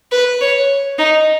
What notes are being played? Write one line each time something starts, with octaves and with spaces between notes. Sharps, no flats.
B4
C#5
D#4